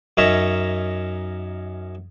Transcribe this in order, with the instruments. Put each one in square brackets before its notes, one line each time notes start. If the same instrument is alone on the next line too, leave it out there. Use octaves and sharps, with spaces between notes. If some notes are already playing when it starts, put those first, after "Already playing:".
[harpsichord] F#2 C#4 D#4 E5 A#5 C#6